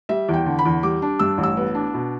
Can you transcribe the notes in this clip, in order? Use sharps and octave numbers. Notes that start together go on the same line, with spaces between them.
G3 E5
E2 G5
D3
B5
E2
G3 D6
D4
G2 E6
A1
E6
B3
D4
B2